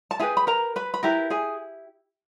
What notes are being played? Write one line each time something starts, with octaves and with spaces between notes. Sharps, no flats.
A5
E4 G4 G#4 B4 G#5
B5
A#4 A#5
B4 B5
B5
E4 G4 A#4 B4 A#5
G#4 G#5